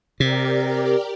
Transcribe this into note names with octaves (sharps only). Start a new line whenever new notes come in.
C3 G4 A#4 D5